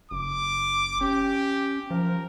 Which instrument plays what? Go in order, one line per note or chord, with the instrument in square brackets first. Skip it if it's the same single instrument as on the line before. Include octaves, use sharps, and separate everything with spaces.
[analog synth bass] F#1 [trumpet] D6
[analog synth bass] C#4 [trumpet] G4
[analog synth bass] F3 [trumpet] A#4